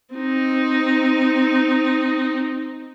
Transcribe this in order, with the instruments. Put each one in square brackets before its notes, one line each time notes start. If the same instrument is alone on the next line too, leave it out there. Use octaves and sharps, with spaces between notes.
[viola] C4 D#4